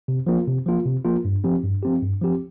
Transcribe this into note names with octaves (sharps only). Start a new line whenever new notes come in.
C3
F3 A#3 F4
C3
F3 A#3 F4
C3
F3 A#3 F4
G2
F3 C4 G4
G2
F3 C4 G4
G2
F3 C4 G4